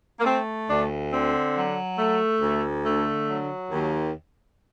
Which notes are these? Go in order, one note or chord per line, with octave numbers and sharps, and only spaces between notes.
A#3
A3 C4
D2 D4
D3 C4
F#3
A3
D2
D3 A3
F#3
D#2